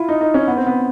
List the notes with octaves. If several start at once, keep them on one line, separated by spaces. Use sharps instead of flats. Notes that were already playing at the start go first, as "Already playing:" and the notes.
Already playing: E4 F4
D#4
D#4
C#4
B3
C4
B3